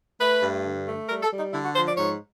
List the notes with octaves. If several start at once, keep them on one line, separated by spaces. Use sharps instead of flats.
A3 B4
G2
D3
A3
G3 A#4
A4
G3
D#4
D3 E4
F#4
F3 C5
D5
G#2 C#5